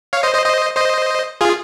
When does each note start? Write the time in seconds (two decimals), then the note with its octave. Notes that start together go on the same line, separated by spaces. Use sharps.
0.13 C#5 F5
0.23 C5 D#5
0.34 C5 D#5
0.45 C5 D#5
0.77 C5 D#5
1.41 F4 G#4